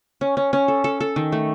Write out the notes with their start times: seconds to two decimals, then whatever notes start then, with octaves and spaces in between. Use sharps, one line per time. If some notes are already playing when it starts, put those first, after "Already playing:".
0.21 C#4
0.37 C#4
0.53 C#4
0.68 A4
0.84 A4
1.01 A4
1.16 D#3
1.32 A3